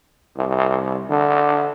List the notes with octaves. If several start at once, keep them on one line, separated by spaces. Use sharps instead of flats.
C2
D3